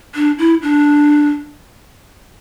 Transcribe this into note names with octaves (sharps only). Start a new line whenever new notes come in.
D4
E4
D4